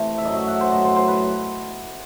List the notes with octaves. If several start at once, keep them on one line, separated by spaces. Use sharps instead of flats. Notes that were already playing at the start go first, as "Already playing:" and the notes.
Already playing: C3 E3 A3
E5
F#2 F#3 A3 D#5
E5
F#5
C5
A2 F#3 B3 D#5
C5
C5
B4